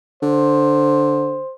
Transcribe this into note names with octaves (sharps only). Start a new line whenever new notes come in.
D3 C5